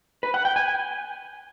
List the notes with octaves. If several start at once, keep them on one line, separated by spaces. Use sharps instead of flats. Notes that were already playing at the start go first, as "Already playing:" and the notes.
B4
F#5
G5
G#5